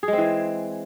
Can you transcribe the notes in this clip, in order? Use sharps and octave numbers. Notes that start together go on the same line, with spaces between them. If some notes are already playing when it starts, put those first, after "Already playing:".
G#4
G#3
C4
E3